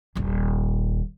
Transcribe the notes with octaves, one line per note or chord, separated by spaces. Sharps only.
D#1 A#1